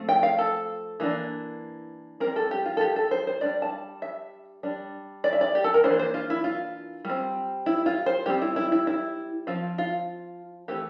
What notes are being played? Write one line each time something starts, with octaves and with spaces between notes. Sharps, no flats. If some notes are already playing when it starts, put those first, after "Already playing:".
Already playing: F3 A3 C4
G5
F5
A4
E3 A#3 D4
G3 C4 A#4
A4
G4
F4
A4
G4
A4
C5
C5
G3 D4 D5
A5
E5
G3 D4
D5
E5
D5
G4
A4
A#4
E3 A#3 D4 C5
C5
F4
E4
F4
G3 C4
E4
F4
C5
G3 C4 G4
E4
E4
E4
E4
F3 C4 F4
F4
E3 A3 C4 G4